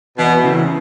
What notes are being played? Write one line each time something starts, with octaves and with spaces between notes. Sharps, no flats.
E2 B2
C#3 E3